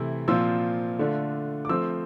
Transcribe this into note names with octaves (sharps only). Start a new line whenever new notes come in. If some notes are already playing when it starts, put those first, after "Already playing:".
Already playing: C3 E3 A3 E4
A#2 F3 C4 F4 E6
D3 A3 D4 F4
D6
F3 A3 C4 E6